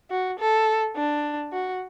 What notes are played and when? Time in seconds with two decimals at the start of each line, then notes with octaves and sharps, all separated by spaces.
0.11 F#4
0.39 A4
0.96 D4
1.52 F#4